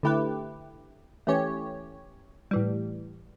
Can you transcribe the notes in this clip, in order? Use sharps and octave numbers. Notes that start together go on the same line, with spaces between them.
D3 A3 E4 G4 B4
E3 A3 C#4 G4 C#5
A2 E3 G3